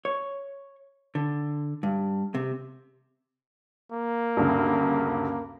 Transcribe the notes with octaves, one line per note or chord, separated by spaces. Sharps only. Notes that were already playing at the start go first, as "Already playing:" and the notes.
C#5
D3
G2
C3
A#3
D2 G2 C#3